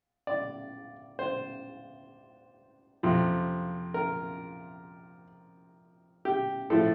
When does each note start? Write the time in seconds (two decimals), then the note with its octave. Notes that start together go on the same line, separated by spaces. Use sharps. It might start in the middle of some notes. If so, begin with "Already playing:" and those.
0.27 D5
1.19 C5
3.03 F2 C3 F3
3.94 A#4
6.25 G4
6.70 A2 F3 A3 A4